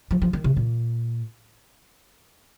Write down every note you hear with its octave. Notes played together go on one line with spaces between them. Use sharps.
F3
F3
D#3
C3
A#2